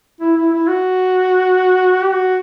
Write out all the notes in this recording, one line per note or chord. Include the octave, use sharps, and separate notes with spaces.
E4
E4
E4
F#4
G4
F#4